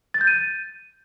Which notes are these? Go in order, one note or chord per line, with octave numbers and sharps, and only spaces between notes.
A6
G6
D#7